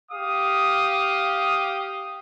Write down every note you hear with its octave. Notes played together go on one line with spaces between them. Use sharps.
G4 F5 D#6